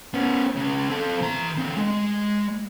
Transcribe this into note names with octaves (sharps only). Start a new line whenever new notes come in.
B3 C#4
C#2 C#3
C4 A4
E3 A#5
D3 C4
G#3